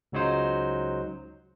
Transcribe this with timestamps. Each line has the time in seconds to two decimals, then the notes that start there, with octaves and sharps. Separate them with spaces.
0.12 C#2 C#3 F#3 D#4 C5